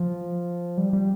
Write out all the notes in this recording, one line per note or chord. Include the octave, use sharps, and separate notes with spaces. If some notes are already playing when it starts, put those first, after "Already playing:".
Already playing: F3
G3
G3